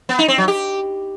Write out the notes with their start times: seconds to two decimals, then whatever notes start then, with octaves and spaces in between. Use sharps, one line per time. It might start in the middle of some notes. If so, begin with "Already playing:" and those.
0.09 B3
0.19 D#4
0.28 C4
0.38 F#3
0.48 G4